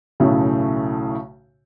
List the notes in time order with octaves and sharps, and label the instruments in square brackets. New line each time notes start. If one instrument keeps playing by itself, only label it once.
[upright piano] B1 A2 C#3 A3